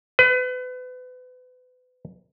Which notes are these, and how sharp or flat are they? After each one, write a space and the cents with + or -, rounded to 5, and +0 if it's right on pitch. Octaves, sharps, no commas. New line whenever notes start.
B4 +35